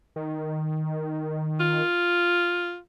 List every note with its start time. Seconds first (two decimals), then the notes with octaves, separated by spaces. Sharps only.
0.16 D#3
1.60 F4